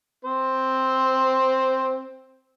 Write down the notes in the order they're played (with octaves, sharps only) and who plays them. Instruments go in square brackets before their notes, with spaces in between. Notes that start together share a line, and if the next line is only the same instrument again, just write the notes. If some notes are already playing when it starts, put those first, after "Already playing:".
[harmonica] C4 C5